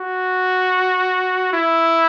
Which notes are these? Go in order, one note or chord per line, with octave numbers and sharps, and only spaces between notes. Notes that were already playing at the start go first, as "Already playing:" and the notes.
Already playing: F#4
E4